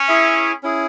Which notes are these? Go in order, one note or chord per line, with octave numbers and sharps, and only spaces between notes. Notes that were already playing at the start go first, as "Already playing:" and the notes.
Already playing: C#4
E4 G#4 E5
C#4 E4 G#4